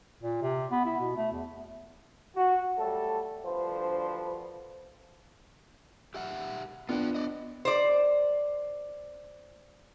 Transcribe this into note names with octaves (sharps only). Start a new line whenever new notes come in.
A#2
C3
B3
E4
B2
A3
E2
F#4
F#3 G3 A3 A4
D2 G2 F3 B4 C5
G4 E5 F#5
B3 D4 F4 G5
D5 D#5
C5 D5